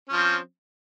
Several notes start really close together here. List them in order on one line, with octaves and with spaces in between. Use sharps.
C#4 F3 C4